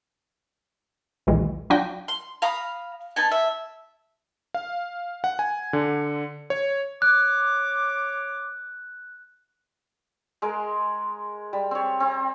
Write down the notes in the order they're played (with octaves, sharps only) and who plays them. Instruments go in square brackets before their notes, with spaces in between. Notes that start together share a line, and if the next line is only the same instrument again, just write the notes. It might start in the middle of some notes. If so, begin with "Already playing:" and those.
[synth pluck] B1 E2 A#2 D#3 E3 G#3
F#3 D4 F4 F#4 G5 A#6
[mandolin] C6
F5 A#5 B5 D#6
B3 D#4 G#5 A5
E5
[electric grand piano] F5
F#5
G#5
D3
C#5
[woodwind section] C#5 D6 [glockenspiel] F#6
[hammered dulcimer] G#3 G#4 A#4
G3
C4 C#5
C4